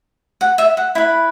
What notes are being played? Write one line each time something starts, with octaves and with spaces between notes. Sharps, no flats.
F#5
E5
F#5
E4 B4